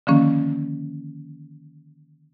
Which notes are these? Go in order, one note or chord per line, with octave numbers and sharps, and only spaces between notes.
D3 D#3 F3 A#3 C#4